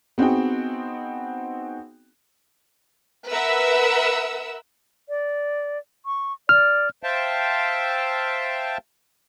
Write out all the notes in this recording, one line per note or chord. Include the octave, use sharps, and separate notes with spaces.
B3 C4 D#4 F#4 G#4 G5
A#4 B4 E5 F#5 E6
D5
C#6
D5 F6
C5 E5 F5 G5 A5